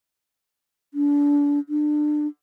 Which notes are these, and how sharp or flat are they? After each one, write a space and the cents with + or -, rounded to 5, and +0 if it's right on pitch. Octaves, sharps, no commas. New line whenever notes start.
D4 -30
D4 +25